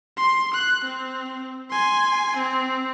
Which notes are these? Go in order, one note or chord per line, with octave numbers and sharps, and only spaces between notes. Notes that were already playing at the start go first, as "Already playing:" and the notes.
C6
F#6
C4
G#5 C6
C4